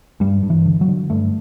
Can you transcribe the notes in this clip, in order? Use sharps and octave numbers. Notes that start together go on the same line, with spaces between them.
G2 G3
G2
E3
D3
F#3
D3
G2 A3